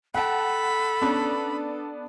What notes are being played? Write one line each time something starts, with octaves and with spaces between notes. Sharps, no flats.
A4 E5 F#5 G5 A5 B5
B3 C#4 D4 B4 D5